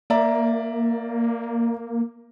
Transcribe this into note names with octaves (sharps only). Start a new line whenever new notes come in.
A#3 D5 E5 A#5